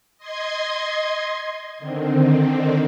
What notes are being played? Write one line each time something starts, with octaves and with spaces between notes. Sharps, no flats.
D#5 C6 G#6
D3 D#3 C4